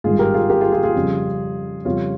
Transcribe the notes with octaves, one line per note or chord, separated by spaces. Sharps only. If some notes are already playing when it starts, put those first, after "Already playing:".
G#1 G2 D#3 G#3 F4 G#4
G4 A#4
F4 G#4
G4 A#4
F4 G#4
F4 G#4
F4 G#4
F2 C#3 G3
F2 C#3 G3 C#4 F4